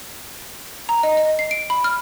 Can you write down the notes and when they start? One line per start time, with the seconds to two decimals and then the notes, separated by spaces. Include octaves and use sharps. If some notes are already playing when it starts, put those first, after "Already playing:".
0.89 A#5
1.03 D#5
1.17 D#5
1.39 C7
1.51 D7
1.70 B5
1.84 F6